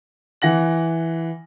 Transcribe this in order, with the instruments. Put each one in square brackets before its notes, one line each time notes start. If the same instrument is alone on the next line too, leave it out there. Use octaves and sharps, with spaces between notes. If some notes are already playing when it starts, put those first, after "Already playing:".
[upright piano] E3 F#5 A#6 F#7